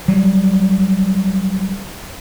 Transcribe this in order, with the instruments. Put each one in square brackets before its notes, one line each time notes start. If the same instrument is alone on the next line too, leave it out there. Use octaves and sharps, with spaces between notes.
[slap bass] F#3 G3